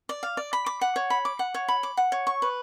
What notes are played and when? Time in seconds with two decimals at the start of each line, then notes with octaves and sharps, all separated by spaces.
0.09 D5
0.23 F5
0.37 D5
0.53 B5
0.66 D6
0.81 F#5
0.96 C#5
1.10 B5
1.25 D6
1.39 F#5
1.54 C#5
1.68 B5
1.83 D6
1.97 F#5
2.12 C#5
2.27 C#6
2.42 B4